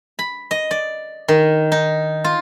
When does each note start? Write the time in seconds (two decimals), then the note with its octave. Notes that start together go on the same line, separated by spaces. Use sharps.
0.19 B5
0.51 D#5
0.71 D5
1.28 D#3
1.72 D#4
2.24 F4